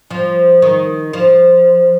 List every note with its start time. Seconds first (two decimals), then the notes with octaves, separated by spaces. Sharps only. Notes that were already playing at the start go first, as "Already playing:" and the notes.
0.10 F3
0.62 D#3
1.13 F3